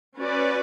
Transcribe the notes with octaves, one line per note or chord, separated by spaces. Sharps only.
C#4 F#4 B4 D5